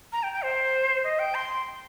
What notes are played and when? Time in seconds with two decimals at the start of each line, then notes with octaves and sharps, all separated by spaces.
0.13 A#5
0.23 G5
0.33 G5
0.44 C5
1.04 D#5
1.19 G5
1.35 C6